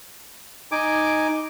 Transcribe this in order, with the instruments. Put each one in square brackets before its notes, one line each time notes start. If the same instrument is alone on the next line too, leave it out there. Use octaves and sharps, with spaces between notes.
[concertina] D#4 G#5 D6